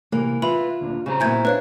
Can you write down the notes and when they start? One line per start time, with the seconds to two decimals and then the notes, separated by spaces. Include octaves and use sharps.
0.12 C3 E3 A#3
0.42 F4 B4 E5 B5
0.81 D2 A#2 D3
1.06 C#3 F#4 C5 A#5
1.20 A#2 B3 E4 G#5 G6 G#6
1.45 D4 B4 C#5 F5